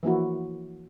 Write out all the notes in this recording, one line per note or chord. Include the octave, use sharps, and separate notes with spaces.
E3 F3 A#3 E4 F#4